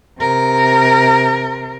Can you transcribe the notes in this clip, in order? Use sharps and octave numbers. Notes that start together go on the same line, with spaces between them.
C3 A#4